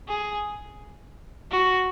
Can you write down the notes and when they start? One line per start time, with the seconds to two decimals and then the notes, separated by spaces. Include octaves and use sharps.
0.08 G#4
1.50 F#4